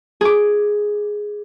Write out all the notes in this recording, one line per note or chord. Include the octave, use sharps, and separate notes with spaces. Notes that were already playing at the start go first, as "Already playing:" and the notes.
G#4 D6